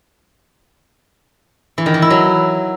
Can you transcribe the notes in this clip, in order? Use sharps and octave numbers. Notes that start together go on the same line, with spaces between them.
E3
D#3
E3
E4
F#3